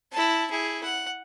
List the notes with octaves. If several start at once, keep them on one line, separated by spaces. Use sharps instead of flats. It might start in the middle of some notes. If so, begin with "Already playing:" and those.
E4 A5
E4 G#4
F#5